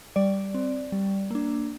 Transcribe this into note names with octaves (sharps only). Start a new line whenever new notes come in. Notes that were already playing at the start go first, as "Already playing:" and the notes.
G3 D5
C4
G3
A#3 D4